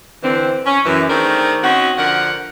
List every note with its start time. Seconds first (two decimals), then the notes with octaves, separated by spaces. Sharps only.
0.23 D3 E3 C4
0.66 C#4
0.85 F#2 E3
1.10 D#3 A3 C4 D4 G#4 A#4
1.63 C4 C#4 D#4 F#4
1.97 D3 F3 A#4 F#5